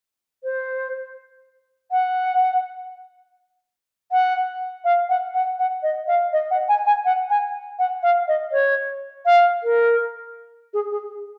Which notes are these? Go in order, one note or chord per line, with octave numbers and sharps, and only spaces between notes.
C5
F#5
F#5
F5
F#5
F#5
F#5
D#5
F5
D#5
F#5
G#5
G#5
F#5
G#5
F#5
F5
D#5
C#5
F5
A#4
G#4
G#4